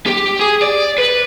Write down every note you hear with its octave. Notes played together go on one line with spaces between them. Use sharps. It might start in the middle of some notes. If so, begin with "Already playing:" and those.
G4
G#4
D5
B4